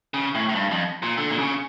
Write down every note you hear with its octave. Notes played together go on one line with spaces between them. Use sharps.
C#3
A2
A2
G2
F2
A#2
D3
A#2
C#3